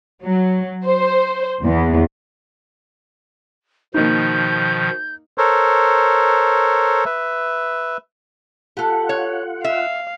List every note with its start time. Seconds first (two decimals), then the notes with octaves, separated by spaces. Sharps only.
0.24 F#3
0.86 C5
1.64 E2
3.94 B2 D#3 F3 A#3 D#4 G6
5.38 A4 A#4 C5 C#5
7.05 B4 E5
8.77 F4 G4 A4 F#5
9.09 C#5
9.64 E5 F5